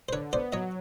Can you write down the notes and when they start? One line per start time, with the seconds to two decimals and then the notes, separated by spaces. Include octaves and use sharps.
0.09 C5
0.12 D3 B4 C#5
0.33 B3 C5 D5
0.52 F#3 C#5 D#5